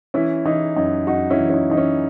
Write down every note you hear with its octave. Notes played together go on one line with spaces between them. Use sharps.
E3 C#4 E4
E3 D#4
F#2 D#4
F#2 D#4 F#4
C#4 E4
E3
C#4
D#4
E3 D#4
C#4